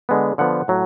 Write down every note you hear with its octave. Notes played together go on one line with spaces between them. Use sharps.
D3 G#3 B3
D3 F3 B3 F#5
A2 F#3